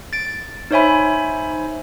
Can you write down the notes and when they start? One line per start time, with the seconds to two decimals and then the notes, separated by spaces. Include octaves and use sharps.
0.13 A6 D7
0.71 D#4 C5 C#5 E5 G#5 B5